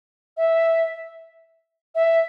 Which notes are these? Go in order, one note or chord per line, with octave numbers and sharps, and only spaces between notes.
E5
E5